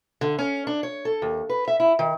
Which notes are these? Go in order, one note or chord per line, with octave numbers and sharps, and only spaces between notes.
D3
C#4
D4
C#5
A4
D#2
B4
E5
E4
D#3